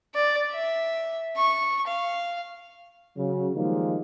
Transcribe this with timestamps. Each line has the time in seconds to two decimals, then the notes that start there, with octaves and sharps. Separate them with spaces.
0.15 D5
0.51 E5
1.37 C#6
1.87 F5
3.17 C#3 F#3
3.54 D#3 F3 G3 G#3 A#3 D#4